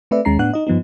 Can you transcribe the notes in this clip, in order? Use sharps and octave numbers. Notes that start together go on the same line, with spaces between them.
A3 C4 B4 D5 E5
D#2 G#3 C#4 A#5 C7
A2 B3 D4 F#5 F#6
D#4 D#5
G2 F3 B3 D#4